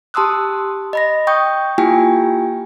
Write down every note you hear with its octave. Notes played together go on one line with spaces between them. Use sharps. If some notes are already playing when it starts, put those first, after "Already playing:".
G4 A5 C6 D#6 E6 F#6
D#5 B5 A#6
G5 C#6 D#6 G6
A#3 E4 F4 G4 G5 G#5